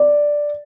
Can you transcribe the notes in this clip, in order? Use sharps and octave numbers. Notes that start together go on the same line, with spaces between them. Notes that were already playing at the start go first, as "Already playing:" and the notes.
Already playing: D5